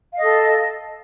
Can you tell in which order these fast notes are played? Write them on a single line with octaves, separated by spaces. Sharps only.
F5 D#5 A4